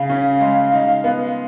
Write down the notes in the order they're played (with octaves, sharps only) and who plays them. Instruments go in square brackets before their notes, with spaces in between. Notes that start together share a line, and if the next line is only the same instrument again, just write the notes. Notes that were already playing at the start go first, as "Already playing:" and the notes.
Already playing: [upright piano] C#3 [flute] F5
[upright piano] C#4
G#3
D#4
B3